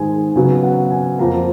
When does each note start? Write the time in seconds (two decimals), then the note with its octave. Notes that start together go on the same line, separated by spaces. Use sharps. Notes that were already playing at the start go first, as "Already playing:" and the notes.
Already playing: G#2 D#3 G#3 G#5
0.36 C#3 F#3 B3 G#5
0.63 F#5
0.91 G#5
1.19 F2 F3 A#3 A#5